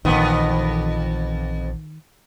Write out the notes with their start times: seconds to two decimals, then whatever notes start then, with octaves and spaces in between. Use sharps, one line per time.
0.05 A#1 F2 D#3 E3 B3